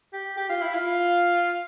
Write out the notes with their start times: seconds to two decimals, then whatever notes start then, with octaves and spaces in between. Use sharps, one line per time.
0.13 G4
0.37 G4
0.49 F4
0.62 E4
0.75 F4